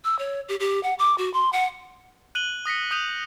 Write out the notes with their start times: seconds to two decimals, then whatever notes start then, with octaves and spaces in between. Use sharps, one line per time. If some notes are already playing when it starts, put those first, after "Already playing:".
0.04 E6
0.19 C#5
0.49 G4
0.60 G4
0.83 F#5
0.99 D6
1.18 F#4
1.33 C6
1.53 F#5
2.35 F#6 D#7 F#7 G7
2.65 D#6 A#6 B6 C#7
2.91 D#6 G6 D#7 F7